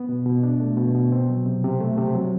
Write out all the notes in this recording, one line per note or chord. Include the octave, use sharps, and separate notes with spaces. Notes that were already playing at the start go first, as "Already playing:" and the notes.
Already playing: B3
B2
B2
D4
A3
B2
B2
C4
F#3
C3
C3
A3
C3
F#3